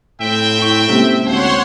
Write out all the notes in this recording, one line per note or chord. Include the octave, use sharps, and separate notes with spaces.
A2 C4 E5 G5
E4 C#6
C3 G#3 A#3 C#4
D2 C4 C5 C#5 F5 F#5 C6